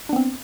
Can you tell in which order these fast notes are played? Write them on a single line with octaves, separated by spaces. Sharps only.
D4 B3 C4